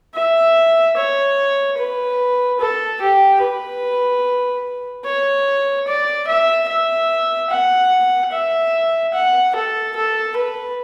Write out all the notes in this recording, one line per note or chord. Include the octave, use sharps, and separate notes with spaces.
E5
C#5
B4
A4
G4
B4
C#5
D5
E5
E5
F#5
E5
F#5
A4
A4
B4